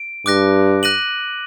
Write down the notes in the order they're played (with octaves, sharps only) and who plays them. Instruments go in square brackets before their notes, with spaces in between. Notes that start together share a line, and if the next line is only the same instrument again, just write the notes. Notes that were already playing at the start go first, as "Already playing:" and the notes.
Already playing: [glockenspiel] D7
[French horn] G2 [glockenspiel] D6 F#6 A#6
[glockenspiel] F#6 A#6 D#7 F#7